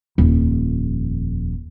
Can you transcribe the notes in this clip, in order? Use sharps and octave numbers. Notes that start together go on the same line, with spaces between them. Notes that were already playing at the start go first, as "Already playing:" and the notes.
D#1 F2